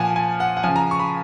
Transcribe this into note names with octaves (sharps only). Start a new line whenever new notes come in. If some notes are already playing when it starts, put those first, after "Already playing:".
Already playing: A#2 F3 F#5 G#5
G#5
F#5
F#5
C#3 F3 G#5
A#5
C#6
B5